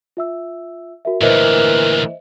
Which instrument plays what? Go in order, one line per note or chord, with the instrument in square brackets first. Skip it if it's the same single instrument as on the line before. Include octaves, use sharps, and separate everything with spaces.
[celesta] F4 E5 E6
F#4 A#4 E5
[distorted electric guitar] D2 A#2 [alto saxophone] E3 [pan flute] A#4 [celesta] C5 D#5 E5